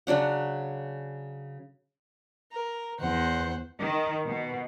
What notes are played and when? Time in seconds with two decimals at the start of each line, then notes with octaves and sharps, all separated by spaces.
0.07 C#3 F#3 D4 F#5
2.52 A#4
3.00 E2 C5 F#5
3.80 D#3
4.27 B2